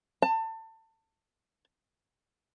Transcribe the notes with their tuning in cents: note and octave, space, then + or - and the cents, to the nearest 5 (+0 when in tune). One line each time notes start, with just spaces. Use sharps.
A5 +25